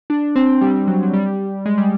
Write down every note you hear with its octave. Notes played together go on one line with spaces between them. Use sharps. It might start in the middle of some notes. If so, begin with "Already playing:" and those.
D4
C4
G3
F#3
F#3
G3
G#3
G3